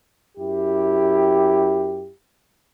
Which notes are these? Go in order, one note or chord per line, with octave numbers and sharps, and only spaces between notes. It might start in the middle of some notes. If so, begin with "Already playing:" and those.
F#2 E4 G4